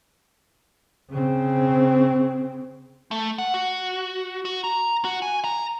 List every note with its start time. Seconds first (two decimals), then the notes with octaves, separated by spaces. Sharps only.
1.10 C#3 C4
3.11 A3
3.38 F#5
3.54 F#4
4.45 F#4
4.64 A#5
5.05 F#4
5.22 G#5
5.44 A#5